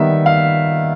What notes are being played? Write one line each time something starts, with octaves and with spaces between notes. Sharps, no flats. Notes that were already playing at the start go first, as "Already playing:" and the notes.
Already playing: D#3 G3 B3 E5
F5